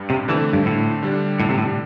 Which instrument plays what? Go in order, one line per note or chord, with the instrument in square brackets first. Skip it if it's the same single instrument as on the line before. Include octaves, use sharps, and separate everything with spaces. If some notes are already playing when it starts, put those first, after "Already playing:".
Already playing: [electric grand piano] G2 G3
[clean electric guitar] C3
[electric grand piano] D3 A3 C4 [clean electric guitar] E3
[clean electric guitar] G2
A2
[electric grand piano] D3 G3 D4
[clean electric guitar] A2
C3
A2